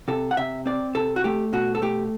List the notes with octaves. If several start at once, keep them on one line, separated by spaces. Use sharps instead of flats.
C3 A4
F#5
C3 E5
C4 D5
C3 A4
F#4
A3 G4
B2 F#4
A4
A3 G4